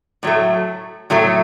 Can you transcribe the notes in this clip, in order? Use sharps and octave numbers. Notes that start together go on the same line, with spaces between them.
A2 F#3 A3
A2 F#3 A3